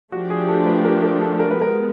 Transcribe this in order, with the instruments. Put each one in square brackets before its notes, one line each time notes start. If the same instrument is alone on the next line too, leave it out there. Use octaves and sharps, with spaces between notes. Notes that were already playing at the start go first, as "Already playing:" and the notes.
[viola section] F3 A3 D4 G4 [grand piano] F#4
[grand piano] G#4
A4
B4
A#4
A#4
A4
A#4
B4
[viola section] F3 G#3 B3 [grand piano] A#4